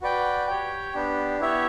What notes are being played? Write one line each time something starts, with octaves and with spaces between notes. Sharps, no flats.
F#4 B4 D5 G5
G4 C#5 G5
B3 D4 G4
B3 E4 G4 C#5 E5